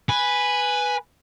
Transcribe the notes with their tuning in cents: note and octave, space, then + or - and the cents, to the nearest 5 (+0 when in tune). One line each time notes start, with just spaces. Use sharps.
B4 +0 G#5 +0